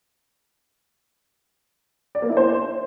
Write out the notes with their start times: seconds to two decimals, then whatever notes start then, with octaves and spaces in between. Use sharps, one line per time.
2.15 D5
2.22 A#3
2.29 E4
2.37 C5